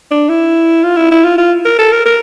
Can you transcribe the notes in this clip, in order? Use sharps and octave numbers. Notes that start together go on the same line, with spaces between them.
D4
E4
F4
E4
E4
F4
F4
A#4
A4
A#4
A#4